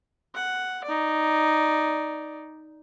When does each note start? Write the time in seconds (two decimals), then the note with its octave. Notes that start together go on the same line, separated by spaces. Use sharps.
0.35 F#5
0.85 D#4 D5